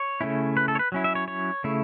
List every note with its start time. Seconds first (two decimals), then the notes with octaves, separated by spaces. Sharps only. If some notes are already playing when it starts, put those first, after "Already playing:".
Already playing: C#5
0.21 C#3 A3 C#4 E4
0.57 B4
0.68 A4
0.75 C#5
0.79 B4
0.92 F#3 C#4 E4
1.04 E5
1.15 C#5
1.28 C#5
1.64 C#3 A3 E4